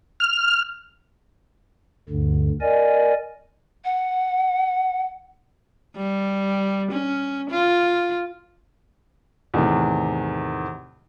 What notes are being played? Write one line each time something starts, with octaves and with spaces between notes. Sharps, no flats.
F6
D2 G2 D3
A#4 D5 D#5 G#5
F#5
G3
C#4
F4
E2 A2 C3 D#3